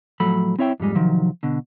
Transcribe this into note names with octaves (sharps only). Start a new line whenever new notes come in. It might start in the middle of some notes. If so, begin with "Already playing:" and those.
A2 F3 F#3 A4 B5
C4 E4 C#5 E5 G5
F2 G#2 G3 G#3
C2 D#3 F3 F#3
B2 D3